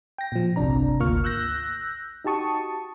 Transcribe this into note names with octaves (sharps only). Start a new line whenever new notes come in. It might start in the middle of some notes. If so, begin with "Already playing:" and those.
G5 A#6
A#2 F3
G1 C2 C3 D4 A#5
G#1 D2 A#3 F4 C#6 F6
E6 F#6 G6 A#6
D#4 F#4 G4 A5 C#6 D#6